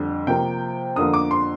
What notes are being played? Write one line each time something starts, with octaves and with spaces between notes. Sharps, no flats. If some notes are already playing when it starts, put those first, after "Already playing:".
Already playing: F2 D3 G3
C3 F3 A#3 G5
F2 D3 F3 A#3 D#6
D6
C6